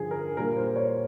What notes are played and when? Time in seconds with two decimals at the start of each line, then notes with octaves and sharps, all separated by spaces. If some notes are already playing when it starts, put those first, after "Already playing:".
Already playing: G2 D3 F3 G#4
0.11 A#4
0.37 A#2 G3 A#3 A#4
0.57 C5
0.76 C#5